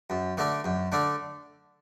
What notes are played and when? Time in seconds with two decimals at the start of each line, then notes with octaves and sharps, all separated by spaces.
0.10 F#2
0.37 D3 A3 D4
0.64 F#2
0.92 D3 A3 D4